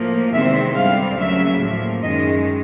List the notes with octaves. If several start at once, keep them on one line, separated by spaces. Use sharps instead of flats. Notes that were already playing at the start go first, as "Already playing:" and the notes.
Already playing: A2 F3 A#3
E2 C3 D#3 G#3 C4 E5
G2 D3 G3 C4 F5
D2 C#3 F#3 A#3 E5
A2 F3 A#3
F#2 D#3 G#3 D#5